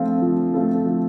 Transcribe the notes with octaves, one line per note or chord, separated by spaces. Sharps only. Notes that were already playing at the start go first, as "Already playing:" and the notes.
Already playing: F3 A3 C4 F4 A4
F3
A3 C4 F4 A4
F3